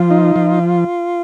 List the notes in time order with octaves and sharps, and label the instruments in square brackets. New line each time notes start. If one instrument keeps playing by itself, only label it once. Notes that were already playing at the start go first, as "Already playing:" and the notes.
Already playing: [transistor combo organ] F3 [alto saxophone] F4
[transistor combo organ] D#4
F3